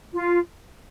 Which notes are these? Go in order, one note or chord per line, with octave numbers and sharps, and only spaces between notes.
F4